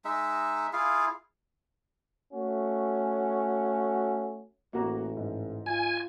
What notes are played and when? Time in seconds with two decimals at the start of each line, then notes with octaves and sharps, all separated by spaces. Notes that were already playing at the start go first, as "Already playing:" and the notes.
0.05 G#3 D#4 E5
0.73 E4 F4 G#4 F5
2.33 A3 C#4 F#4
4.73 A1 A#3 F#4 A#5
5.17 G#2
5.66 F4 G#5